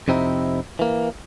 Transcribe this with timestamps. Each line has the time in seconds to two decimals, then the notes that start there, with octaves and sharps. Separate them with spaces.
0.08 F2 C3 C4 D#4 E4
0.79 E3 A#3